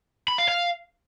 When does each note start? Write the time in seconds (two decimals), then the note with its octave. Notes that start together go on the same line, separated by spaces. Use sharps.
0.28 B5
0.38 F5
0.49 F5